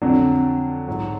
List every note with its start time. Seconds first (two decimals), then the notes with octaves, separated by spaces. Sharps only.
0.02 F2 D3 F#3 D4
0.88 G#2 F#3